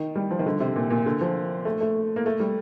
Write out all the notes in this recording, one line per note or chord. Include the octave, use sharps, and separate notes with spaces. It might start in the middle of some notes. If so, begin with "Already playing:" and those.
Already playing: D#3
G3
F3
D#3
D3
C3
A#2
A#2
D3
F3
A3
A3
A#3
A3
G3